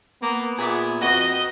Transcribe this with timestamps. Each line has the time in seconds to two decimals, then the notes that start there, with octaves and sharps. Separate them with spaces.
0.22 A#3 B3
0.58 A#2 G#4 E5 D6
1.01 F2 F#4 B4 D#5